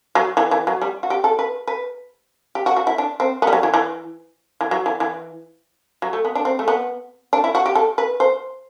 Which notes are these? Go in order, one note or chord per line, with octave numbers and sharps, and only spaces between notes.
F#3
E3
E3
F#3
G3
F#4
G4
A4
B4
B4
G4
F#4
F#4
E4
D4
C4
B3
G3
F#3
E3
E3
E3
F#3
E3
E3
F#3
A3
B3
D4
C4
A3
B3
D4
E4
F#4
G4
A4
B4
C5